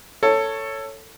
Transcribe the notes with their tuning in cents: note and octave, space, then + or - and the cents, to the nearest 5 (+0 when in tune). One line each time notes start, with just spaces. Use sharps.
A4 +15 C#5 +0